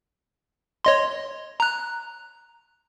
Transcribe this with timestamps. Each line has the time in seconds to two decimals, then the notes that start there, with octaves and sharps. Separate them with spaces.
0.85 C#5 D#5 C6
1.60 A#5 F#6